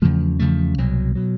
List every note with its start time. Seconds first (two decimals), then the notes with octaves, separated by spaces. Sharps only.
0.02 E2 C#3 F3 A3
0.39 E2 C#3 F3 A3
0.78 C2 B2 F#3
1.15 B2 F#3